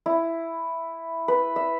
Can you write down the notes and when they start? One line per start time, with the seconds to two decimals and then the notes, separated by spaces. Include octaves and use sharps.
0.06 E4
1.28 B4
1.56 E5